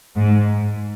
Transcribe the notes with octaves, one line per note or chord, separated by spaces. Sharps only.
G#2